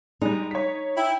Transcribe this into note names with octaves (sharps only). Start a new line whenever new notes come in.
G3 G#3 D#4
C#5 B6
E4 G5